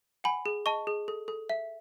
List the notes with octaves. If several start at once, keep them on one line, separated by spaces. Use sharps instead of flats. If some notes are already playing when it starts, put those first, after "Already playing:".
F#5 G#5 B5
G#4
D#5 A5 C#6
G#4
A4
A4
E5